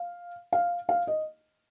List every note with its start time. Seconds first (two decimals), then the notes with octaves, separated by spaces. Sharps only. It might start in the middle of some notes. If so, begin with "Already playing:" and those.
Already playing: F5
0.52 F5
0.89 F5
1.07 D#5